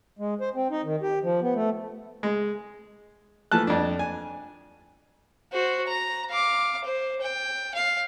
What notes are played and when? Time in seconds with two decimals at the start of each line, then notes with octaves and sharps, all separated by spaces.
0.19 G#3
0.41 C5
0.55 C4
0.71 D#4
0.84 D#3
1.02 G4
1.23 F3
1.42 B3
1.54 A3
2.23 G#3
3.52 E3 F3 A3 A5 F#6
3.67 F2 D4
3.99 G#5
5.52 F#4 C5
5.87 A#5
6.29 F5 D6
6.84 C5
7.21 G5
7.74 F5